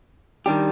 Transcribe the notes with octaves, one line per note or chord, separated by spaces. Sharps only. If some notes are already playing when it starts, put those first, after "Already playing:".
D#3 G3 D4 G4